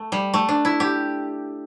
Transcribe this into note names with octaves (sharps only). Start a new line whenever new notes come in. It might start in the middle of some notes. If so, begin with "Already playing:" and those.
Already playing: A3
G3
A3
D4
E4
G4